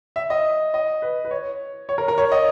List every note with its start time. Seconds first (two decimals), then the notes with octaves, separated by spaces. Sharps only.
0.16 E5
0.30 D#5
0.74 D#5
1.02 B4
1.25 B4
1.31 C#5
1.89 C#5
1.98 A#4
2.08 A#4
2.18 C#5
2.32 D#5